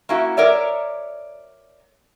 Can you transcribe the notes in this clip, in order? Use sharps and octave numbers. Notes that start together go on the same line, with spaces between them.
A#3 C#4 E4 F#4
A#4 C#5 D5 E5